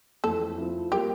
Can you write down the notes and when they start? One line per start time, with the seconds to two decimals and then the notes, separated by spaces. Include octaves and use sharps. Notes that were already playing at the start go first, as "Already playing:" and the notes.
0.24 F2 E3 A3 A4
0.58 F3 C4 E4
0.92 G3 A#3 F4 G4 A#4